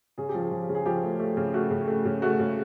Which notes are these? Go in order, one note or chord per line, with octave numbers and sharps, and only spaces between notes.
C#3 G#4
G4
F3
G#4
F3
C#3
G#4
F3 G4
A3
A3
C#3
A3 F#4
C#3
A3
C#3
A3 F#4
C#3